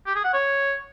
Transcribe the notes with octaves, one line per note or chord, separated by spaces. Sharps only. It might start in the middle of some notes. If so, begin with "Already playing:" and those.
G4
G#4
F#5
C#5